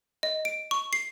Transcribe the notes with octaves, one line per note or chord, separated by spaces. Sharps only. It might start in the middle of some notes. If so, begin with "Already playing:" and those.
D#5
D7
C#6
C7